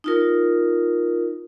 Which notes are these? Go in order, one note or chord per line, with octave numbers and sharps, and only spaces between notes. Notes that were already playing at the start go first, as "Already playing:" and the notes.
D#4 F4 A#4